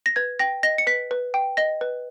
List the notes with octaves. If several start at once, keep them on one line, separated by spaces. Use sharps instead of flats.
A#6
B4 G#6
G5 A#6
D#5 A#6
C#7
B4 B6
B4
G5
D#5 A#6
B4